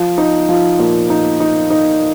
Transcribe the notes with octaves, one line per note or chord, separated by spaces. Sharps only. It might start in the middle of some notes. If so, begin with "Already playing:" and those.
Already playing: F3
D#4
F3
A#2
D#4
D#4
D#4